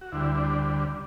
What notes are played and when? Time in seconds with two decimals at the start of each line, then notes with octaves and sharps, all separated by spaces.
0.01 F#4
0.12 D2 D3 G3 E4
0.38 D4